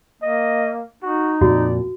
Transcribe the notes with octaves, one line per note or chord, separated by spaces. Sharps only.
A#3 D#5
D#4 F#4
F2 A#2 F#4 D5